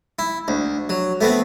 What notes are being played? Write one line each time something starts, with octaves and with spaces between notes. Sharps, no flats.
E4
D2
F#3
A3 B3 C4